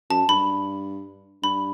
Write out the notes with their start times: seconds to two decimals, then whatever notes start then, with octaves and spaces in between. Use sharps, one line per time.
0.10 F#2 A5
0.29 G2 B5
1.43 G2 B5